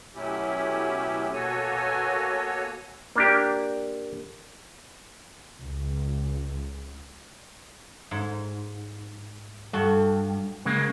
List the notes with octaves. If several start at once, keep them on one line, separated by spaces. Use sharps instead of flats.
B2 F#3 A3 C#4 E4 G4
B2 A#3 F#4 A4 C#5 G#5
A#3 D4 G4
C#2
G#2
G2 F#4 A4
C#3 G#3 A#3